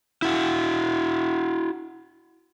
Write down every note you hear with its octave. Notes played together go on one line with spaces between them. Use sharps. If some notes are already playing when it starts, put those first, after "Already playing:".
E4 F#4